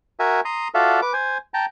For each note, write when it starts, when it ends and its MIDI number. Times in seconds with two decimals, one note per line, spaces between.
0.19 0.41 66
0.19 0.41 70
0.19 0.41 76
0.19 0.41 80
0.45 0.68 82
0.45 0.68 84
0.45 0.68 87
0.74 1.00 65
0.74 1.00 66
0.74 1.00 69
0.74 1.00 74
0.74 1.00 76
0.74 1.00 77
1.02 1.13 71
1.02 1.13 86
1.13 1.38 72
1.13 1.38 80
1.54 1.66 79
1.54 1.66 81
1.54 1.66 82